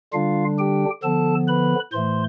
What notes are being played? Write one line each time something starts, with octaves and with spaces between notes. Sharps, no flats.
D3 G3 D4 F4 F5
G4 G5
D3 F3 B3 A4 A5
B4 B5
A2 E3 A3 C5 C6